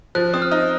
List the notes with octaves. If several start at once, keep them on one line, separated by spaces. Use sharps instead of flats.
F3 F#6
C4 D#6
F6
D#4